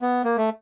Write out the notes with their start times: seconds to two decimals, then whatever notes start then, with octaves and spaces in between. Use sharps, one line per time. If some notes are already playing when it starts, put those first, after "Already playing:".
0.02 B3
0.24 A#3
0.37 A3